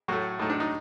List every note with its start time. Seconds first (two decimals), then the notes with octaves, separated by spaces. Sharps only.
0.08 A2 F#3 A3 F#4
0.39 A2 A3 D#4
0.50 D4
0.60 D#4